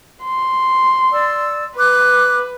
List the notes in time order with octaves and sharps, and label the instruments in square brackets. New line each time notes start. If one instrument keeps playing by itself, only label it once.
[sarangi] C6
[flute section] D5 E6
[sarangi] B4 [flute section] D6 F#6